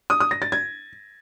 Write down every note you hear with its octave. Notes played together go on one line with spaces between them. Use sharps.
D#6
D#6
A#6
A6
G#6